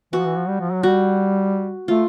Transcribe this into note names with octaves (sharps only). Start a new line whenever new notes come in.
E3 F#4
F3
E3
F3
G3
F3
F#3
G3 F#4
A3 F4